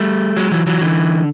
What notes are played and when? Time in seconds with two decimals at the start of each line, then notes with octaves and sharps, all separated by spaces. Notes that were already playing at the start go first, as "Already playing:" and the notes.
Already playing: G3 A3
0.36 F#3 G#3
0.52 E3 F#3
0.67 E3 F#3
0.81 D3 E3